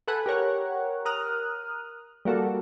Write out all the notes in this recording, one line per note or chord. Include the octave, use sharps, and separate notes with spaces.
A4 B4 F#5 G#5
G4 A#4 C#5 F#5
A#4 D#6 F6 F#6
G3 A#3 F#4 A4